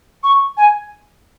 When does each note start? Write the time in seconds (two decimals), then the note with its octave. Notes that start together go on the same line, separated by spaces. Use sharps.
0.23 C#6
0.57 G#5